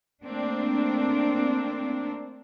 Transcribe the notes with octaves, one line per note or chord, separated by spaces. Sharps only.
A3 A#3 C4 D4